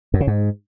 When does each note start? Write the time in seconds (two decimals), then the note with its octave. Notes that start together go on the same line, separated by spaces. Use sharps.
0.14 F#2
0.20 C#3
0.27 G#2